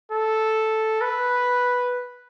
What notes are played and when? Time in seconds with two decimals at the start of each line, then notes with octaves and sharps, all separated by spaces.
0.12 A4
1.01 B4